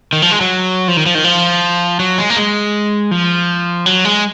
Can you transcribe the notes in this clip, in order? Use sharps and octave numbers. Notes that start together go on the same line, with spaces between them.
D#3
F3
G#3
F#3
F3
D#3
F3
D#3
F3
F#3
G#3
A#3
G#3
F3
F#3
G#3